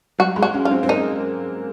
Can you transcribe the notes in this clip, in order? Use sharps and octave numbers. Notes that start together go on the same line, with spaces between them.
F#3 F#4
G#3
F#4
C#4
F4
C4
C4
A#3 D#4